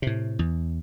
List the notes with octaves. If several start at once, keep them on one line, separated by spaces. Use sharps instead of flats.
A2 C3
E2